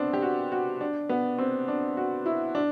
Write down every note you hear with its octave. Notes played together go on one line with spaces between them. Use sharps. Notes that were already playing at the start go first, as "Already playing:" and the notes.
Already playing: B3 C4 D4
G4
F#4
F#4
D4
B3
C4
D4
F#4
E4
D4